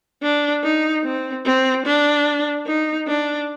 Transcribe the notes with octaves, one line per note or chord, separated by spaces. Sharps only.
D4
D#4
C4
C4
D4
D#4
D4